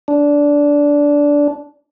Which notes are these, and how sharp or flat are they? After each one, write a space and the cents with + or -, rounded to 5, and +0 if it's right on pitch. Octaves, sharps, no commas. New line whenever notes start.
D4 -15